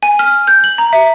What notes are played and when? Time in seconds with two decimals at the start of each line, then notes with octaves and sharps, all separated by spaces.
0.03 G#5
0.19 F6
0.47 G6
0.64 F#7
0.78 A#5
0.93 E5